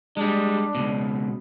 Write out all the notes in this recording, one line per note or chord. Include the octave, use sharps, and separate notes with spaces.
G3 G#3 D4
C#2 B2